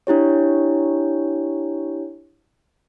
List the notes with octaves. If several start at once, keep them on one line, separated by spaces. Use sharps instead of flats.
D4 E4 G4 C#5